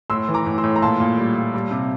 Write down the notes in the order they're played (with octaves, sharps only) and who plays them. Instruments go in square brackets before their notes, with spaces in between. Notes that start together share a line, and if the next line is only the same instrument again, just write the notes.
[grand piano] A2 C6 E6
E3
A#5 D6
A2
C6 E6
A2
A#5
A#2 A5 C6
A#2
G3
A#2
G3
C3